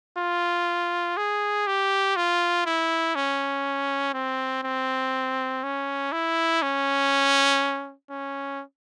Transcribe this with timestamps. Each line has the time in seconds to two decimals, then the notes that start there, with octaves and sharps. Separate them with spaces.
0.19 F4
1.17 G#4
1.67 G4
2.16 F4
2.66 E4
3.16 C#4
4.14 C4
4.64 C4
5.64 C#4
6.12 E4
6.62 C#4
8.11 C#4